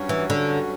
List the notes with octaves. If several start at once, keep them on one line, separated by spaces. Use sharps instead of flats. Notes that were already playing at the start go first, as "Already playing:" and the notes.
Already playing: G2 F#3 C#4 F#4
E3
D3